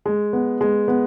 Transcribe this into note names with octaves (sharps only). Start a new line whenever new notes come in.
G#3
B3
G#3
B3